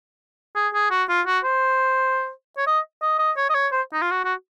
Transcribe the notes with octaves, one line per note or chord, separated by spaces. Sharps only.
G#4
G#4
F#4
F4
F#4
C5
C#5
D#5
D#5
D#5
C#5
D#5
C#5
C5
D#4
F4
F#4
F#4